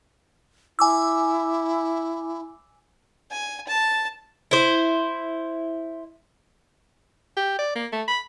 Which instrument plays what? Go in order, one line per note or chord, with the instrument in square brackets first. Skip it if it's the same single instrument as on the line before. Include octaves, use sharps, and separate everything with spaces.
[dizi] E4 [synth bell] G#5 D6 E6
[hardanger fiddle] G#5
A5
[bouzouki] E4 C5
[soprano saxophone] G4
D5
A#3
A3
B5